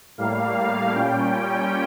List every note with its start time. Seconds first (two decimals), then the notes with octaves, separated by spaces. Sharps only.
0.18 A2 G3 A#3 F5
0.92 A#2 G3 C#4 G5